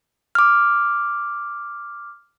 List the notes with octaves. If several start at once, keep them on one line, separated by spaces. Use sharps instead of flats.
D6 F6